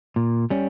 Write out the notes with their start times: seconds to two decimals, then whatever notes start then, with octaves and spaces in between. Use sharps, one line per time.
0.16 A#2
0.50 G3 C#4